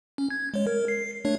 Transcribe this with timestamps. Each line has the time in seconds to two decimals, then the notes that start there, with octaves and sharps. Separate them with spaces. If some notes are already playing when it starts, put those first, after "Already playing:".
0.18 C#4
0.30 G#6
0.54 G#3 C#5
0.67 A#4
0.88 C7
1.25 A3 D4 C#5